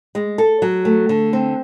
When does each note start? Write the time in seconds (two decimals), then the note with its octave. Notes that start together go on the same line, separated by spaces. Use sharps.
0.15 G#3
0.38 A4
0.62 F#3
0.85 A3
1.09 D3
1.33 C4